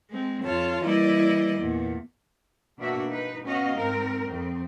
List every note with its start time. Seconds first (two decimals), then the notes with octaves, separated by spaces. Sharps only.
0.11 G#3 C4
0.43 F2 F4 C#5 A5
0.83 E3 G3 A#3 E4 D5 D#5
1.59 E2 A#2
2.78 B2 A#3 D4 F#4 E5
3.08 D#4 B4
3.44 B3 C#4 F#4 D#5 F5
3.75 G#2 C4 A#4
4.27 F2 C4